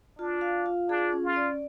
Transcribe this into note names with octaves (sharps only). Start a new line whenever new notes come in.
D4 F4
F5
F4
D4 G#4
C#4
F4
D5